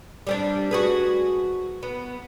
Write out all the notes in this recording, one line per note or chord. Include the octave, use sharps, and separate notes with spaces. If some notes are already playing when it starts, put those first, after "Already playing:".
G3 C4 D4
F#4 G#4 B4
B3